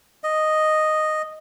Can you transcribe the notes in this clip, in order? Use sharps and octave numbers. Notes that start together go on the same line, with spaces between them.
D#5